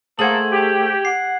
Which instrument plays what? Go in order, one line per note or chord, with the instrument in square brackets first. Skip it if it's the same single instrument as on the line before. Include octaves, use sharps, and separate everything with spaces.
[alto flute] A3 [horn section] A#3 A4 [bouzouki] G#4 C5 F#5 [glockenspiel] G#6 F#7
[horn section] G4
[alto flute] F#5 [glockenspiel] C7